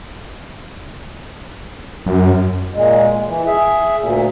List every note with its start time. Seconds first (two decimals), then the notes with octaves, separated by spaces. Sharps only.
2.06 F#2
2.74 A#2 G#3
3.26 E3
3.47 G#4 E5
3.99 D2 A#2